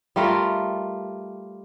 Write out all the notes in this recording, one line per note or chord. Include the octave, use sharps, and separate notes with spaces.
G3 A3 F4 A#4